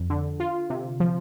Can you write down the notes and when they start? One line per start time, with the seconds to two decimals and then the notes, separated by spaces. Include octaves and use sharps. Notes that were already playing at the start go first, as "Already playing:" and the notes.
Already playing: F2
0.10 D3
0.40 F4
0.70 C3
1.00 F3